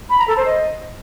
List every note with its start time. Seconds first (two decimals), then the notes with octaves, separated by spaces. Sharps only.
0.10 B5
0.19 A#5
0.28 A4
0.37 C5
0.46 D#5